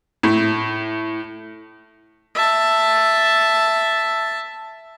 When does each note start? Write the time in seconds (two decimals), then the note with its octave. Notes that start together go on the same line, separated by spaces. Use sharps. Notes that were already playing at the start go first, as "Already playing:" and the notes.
0.23 A2
2.35 E5 A5